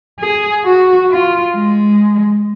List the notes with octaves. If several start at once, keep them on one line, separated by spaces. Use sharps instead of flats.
G#4
F#4
F4
G#3